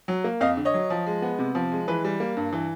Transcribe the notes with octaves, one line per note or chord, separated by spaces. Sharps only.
F#3
A#3
F2 D#5 F5
D3
C#5 D#5
F#3
F3
G#3
B3
C3
F3
G#3
E3 B4
G3
A#3
G2
E3